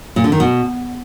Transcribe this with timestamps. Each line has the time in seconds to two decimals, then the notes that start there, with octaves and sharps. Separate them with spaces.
0.16 A#2
0.24 D3
0.32 D#3
0.40 B2